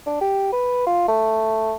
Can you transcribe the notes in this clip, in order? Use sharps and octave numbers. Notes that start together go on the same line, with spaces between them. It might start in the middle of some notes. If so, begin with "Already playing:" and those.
D4
G4
B4
F4
A3